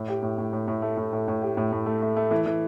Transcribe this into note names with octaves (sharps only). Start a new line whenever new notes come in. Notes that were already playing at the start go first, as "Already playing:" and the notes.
Already playing: A2
G4
A2
A2
A2
A2
A3
A2
A2
A2
G4
A2
A2
A3
A3
A3
E3
E3